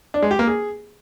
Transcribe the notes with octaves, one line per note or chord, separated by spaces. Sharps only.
D4
G#3
G4
A#3
G#4